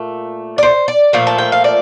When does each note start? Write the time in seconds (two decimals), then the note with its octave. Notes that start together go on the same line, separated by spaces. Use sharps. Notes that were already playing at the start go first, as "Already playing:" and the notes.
Already playing: A#2 A3
0.58 D5
0.63 C5
0.88 D5
1.13 A#2 F3 A3
1.27 A5
1.38 G5
1.52 F5
1.64 D5